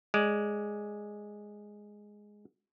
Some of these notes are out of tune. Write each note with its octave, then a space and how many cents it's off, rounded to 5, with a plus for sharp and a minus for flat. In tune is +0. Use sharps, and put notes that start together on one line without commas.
G#3 +0 D5 +0